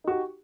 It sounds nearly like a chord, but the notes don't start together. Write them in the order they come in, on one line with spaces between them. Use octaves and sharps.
D#4 F#4 G4